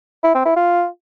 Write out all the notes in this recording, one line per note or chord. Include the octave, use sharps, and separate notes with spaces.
E4
C4
E4
F4